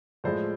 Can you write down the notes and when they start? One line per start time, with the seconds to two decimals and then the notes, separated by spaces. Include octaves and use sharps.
0.24 A2 F3 G#3 C5 D5